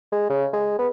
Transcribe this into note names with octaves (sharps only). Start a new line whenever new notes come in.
G#3
C#3
G#3
B3